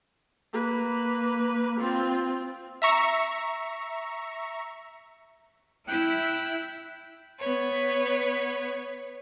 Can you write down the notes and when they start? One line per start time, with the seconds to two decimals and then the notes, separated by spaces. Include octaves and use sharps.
0.53 A#3 B4
1.79 C4 F4
2.82 E5 A#5 C#6
5.88 E4 G5 F#6
7.39 B3 B4 C#5